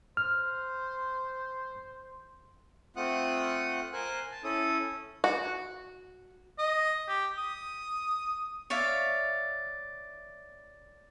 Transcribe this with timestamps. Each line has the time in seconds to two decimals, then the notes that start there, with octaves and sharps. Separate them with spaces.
0.17 C5 F6
2.96 A3 C4 F4 F#5 D#6 F#6
3.93 A#4 C5 G#5 F#6
4.31 A5
4.44 C#4 E4 A4 D#6
5.24 F#4
6.58 D#5
7.08 G4
7.38 D#6
8.70 C#5 D5 E5 F5